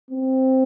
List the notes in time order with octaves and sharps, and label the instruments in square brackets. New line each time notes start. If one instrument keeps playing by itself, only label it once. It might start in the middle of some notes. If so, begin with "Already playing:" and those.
[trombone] C4